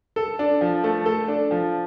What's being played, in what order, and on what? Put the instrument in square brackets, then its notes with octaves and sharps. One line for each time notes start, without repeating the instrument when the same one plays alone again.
[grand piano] A4
D4
F3
A3
A4
D4
F3